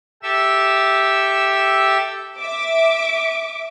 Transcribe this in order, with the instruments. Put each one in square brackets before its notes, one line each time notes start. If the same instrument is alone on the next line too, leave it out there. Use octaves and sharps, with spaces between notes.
[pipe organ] G4 A4 E5 E6
[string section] E5 D6